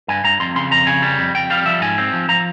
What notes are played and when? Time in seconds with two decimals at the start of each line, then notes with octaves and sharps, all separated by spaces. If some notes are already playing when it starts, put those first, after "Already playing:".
0.08 G2 G#5
0.24 G2 A#5
0.40 F2 C6
0.56 C#3 C6
0.71 F2 A#5
0.87 C#3 G#5
1.02 G3
1.19 F2
1.34 F2 G5
1.50 G3 F5
1.65 F3 E5
1.81 G#2 G#5
1.98 C4
2.13 F3
2.28 F3 A#5